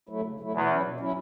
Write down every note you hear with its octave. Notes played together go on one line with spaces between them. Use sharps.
F#3 A3 E4
C#3
F#3 A3 E4
E2 B2
F#3 C#4 E4
B2
F#3 C#4 E4